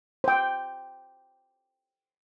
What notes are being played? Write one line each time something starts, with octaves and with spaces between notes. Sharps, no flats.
C5 G5